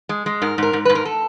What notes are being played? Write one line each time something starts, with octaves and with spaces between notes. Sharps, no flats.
G#3
G#3
G#2 A#4
G#2 A#4
G#2
G#2 B4
A#4
A4